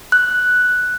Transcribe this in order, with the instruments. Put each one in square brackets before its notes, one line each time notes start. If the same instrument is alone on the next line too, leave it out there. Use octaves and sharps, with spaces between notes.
[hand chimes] F#6